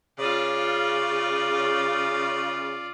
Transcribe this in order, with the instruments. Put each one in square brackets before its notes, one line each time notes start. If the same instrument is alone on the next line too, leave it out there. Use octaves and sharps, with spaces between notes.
[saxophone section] C#3 [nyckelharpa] F4 D5